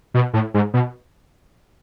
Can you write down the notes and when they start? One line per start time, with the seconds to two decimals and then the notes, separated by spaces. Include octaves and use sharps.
0.14 B2
0.34 A2
0.54 G#2
0.74 B2